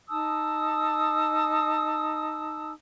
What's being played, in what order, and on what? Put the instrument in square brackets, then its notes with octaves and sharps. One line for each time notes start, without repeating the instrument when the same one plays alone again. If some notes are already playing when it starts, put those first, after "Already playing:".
[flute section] D#4 A5 D#6 E6